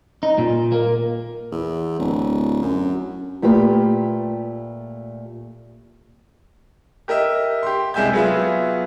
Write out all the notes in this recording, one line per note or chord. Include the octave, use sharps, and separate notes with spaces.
D#4
A#2
A#3
E2
D1
F#2
A#2 A3 F4 G4 B4
G4 A#4 D#5 E5
G4 C6
C2 G#3 E5 G#5 E6 G6
F#3 B3 F4 G#4 B4 E5